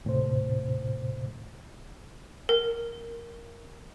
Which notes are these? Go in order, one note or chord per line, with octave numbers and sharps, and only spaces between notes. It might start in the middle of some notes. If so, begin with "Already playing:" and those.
D#2 A2 C3 C5
A#4